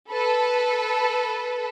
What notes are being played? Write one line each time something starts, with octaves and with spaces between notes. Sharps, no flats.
A4 B4